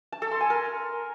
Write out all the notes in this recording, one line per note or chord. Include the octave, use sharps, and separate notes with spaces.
A5
A4
C6
G#5
A#4